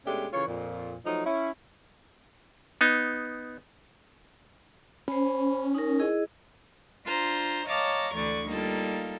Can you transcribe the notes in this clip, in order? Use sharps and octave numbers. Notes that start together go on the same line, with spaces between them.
B2 G#3 A3 C#4 D4 G4
C#3 E3 F4 A4 C#5
F2 A#2
F3 F#3 A3 D#4
C#4 E4
B3 D#4
C#4 C5 B5
D#4 A#4
E4 G#4 D#5
D4 F4 C5 A#5
C#5 D#5 F5 A5 A#5 D6
D2 D3 E3 D5 C#6
G3 A#3 D#4 F4 A4